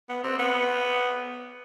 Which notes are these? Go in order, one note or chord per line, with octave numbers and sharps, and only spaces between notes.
B3
C4
B3